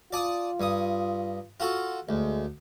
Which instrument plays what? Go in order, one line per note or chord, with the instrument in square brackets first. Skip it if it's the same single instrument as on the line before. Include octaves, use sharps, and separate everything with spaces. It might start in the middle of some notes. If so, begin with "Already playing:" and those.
[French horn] F4 [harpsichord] D5 A5 D#6
[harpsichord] G2 D#6
F4 F#4 A4
[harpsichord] D2 [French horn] G#3